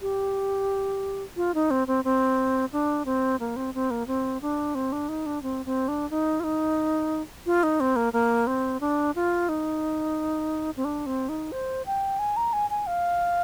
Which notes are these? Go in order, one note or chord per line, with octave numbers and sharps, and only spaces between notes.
G4
F4
D#4
C4
C4
C4
D4
C4
A#3
C4
C4
A#3
C4
D4
C4
D4
D#4
D4
C4
C4
D4
D#4
F4
D#4
F4
D#4
C4
A#3
A#3
C4
D4
F4
D#4
C4
D4
C4
D#4
C5
G5
G#5
A#5
G#5
G#5
F5